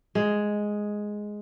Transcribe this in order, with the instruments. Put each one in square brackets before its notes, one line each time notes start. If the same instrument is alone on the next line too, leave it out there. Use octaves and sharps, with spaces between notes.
[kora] G#3